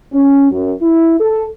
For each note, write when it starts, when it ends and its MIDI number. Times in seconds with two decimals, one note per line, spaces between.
0.13 0.50 61
0.51 0.73 42
0.82 1.15 64
1.20 1.45 69